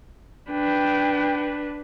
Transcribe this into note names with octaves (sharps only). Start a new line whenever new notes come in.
D4 B4 G5